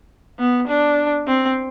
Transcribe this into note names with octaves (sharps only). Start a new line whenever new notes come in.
B3
D4
C4